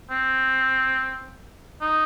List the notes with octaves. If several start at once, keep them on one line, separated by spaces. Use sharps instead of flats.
C4
D#4